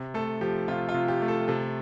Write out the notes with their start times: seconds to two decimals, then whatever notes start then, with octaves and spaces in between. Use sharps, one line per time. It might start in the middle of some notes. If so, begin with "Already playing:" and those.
Already playing: C3
0.14 A3 A4
0.41 F3 G4
0.68 C3 F4
0.89 F4
0.94 C3
1.08 G4
1.22 A3
1.28 A4
1.48 C3 A4